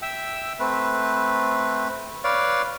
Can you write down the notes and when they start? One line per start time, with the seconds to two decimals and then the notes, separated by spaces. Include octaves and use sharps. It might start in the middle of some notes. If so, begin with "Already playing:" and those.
0.02 E5 G5 E6
0.59 A3 C4 B4
2.24 B4 C#5 D5 F5